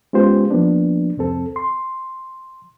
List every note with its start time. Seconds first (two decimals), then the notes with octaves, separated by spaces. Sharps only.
0.13 G#3 B3 C#4 F4 G4 C5
0.51 F3 A#3 B3 D4
1.17 C2 F2 C4 A4
1.56 C6